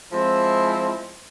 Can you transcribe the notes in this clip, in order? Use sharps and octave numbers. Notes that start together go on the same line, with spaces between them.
F3 G#3 C4 E4